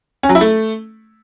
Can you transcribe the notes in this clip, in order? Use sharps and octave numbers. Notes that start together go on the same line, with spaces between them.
C#4
F#3
E4
A3